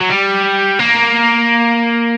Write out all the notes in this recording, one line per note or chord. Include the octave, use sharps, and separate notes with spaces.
F#3
G3
A#3